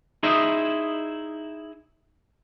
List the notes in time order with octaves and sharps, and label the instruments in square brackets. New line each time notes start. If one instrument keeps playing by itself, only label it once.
[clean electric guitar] D#4 E4 G#4 C5 D#5 E5